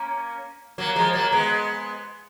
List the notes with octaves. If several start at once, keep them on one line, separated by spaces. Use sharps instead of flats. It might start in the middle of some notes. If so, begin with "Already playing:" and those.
Already playing: A#3 C#4
F#3 A#3
F3 G#3
F#3 A#3
G#3 B3